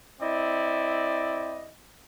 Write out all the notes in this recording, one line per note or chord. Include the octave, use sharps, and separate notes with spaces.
C4 E4 D5 D#5